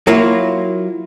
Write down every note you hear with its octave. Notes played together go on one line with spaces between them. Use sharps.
F#3 A#3 E4 F4